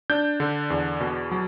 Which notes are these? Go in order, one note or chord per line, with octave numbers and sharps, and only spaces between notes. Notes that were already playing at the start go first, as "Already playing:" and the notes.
D4 G6
D3
E2
B2
F#3